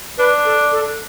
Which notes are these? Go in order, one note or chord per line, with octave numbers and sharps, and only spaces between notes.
D4 B4
A4
A4